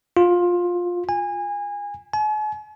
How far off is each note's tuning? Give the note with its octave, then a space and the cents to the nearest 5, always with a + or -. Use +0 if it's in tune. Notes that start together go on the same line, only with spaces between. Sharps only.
F4 +15
G#5 -25
G#5 +45